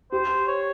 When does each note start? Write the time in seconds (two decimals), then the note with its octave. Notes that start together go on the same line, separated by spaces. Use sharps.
0.12 G4 C5
0.47 C#5